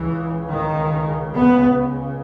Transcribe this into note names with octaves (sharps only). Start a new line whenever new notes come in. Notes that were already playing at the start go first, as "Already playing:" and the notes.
Already playing: C#2 C#3 E3
D#3
B3